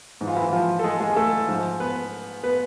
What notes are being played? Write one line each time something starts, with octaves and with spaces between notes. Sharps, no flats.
G#2 E3
F4
E3 E4
F3 F4
A4
G#3 G#4
G#3 G#4
G#4
A3 A4
G#2 F3
B3 B4
B3 B4